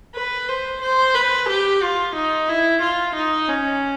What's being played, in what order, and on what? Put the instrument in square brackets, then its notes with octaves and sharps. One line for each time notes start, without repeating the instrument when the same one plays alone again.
[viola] B4
C5
C5
B4
G4
F4
D#4
E4
F4
D#4
C#4